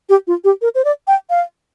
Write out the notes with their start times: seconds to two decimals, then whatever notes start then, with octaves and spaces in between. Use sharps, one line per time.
0.09 G4
0.27 F4
0.44 G4
0.62 A#4
0.75 C5
0.85 D5
1.08 G5
1.30 F5